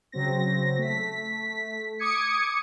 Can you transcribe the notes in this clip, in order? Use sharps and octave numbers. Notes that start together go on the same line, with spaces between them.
C#3 F#3 C4 A#6
A3 B6
D6 D#6 G#6 C#7